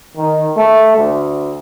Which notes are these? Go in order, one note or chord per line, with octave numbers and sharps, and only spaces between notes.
D#3
A3
D2